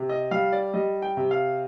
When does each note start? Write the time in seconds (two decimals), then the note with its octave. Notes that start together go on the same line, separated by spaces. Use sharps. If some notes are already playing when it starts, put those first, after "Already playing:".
Already playing: C3
0.09 D#5
0.31 G3 F5
0.52 D5
0.74 G3 D#5
1.02 G5
1.17 C3
1.31 F5